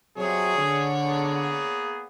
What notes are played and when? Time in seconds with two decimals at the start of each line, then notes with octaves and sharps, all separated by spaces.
0.17 C3 F#3 C#4 G#4 C#5 D5
0.57 D3
1.06 A#3 B3 G#4